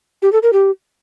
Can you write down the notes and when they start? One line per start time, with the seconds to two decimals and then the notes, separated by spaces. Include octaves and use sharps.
0.22 G4
0.32 A4
0.43 A#4
0.53 G4